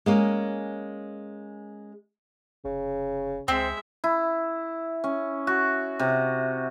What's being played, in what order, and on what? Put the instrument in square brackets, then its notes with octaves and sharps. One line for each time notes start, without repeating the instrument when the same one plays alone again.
[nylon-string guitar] G#3 A#3 C#4
[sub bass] F1 [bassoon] C#3
[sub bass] C#2 [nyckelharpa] G#3 E5 [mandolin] C4
[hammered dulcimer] E4
C#4
F#4
C3